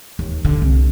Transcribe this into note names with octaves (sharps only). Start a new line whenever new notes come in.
D#2
D3
C2